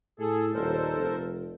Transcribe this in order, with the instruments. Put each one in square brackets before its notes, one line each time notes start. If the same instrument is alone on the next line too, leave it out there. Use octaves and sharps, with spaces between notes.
[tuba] A2 [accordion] G#4 A4
[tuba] D#1 [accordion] A4 A#4 C5
[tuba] F1